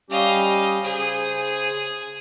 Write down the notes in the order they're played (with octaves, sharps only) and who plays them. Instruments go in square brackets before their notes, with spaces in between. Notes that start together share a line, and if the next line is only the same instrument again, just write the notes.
[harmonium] G3 C#4 G4 [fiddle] D#5 F5
[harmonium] C#3 C5 [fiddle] G#4